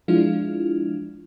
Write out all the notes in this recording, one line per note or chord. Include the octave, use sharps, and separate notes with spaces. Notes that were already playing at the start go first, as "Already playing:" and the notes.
F3 G#3 D4 E4 F4